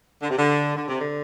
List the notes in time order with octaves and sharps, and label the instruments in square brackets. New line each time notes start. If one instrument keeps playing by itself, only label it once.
[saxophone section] D3
C3
D3
D3
C3
D3